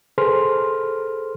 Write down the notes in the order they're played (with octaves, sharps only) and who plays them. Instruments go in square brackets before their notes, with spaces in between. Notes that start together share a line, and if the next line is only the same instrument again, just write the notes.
[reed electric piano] G#4 A4 B4 C5 C6 F6